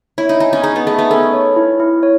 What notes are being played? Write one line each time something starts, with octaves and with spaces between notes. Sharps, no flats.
E4 C#5
D#4
D#4 G#5
C#4
D#4 G#4
B3
A3 G#4
B3
C#4 A4
C#5
E4
E4
C#5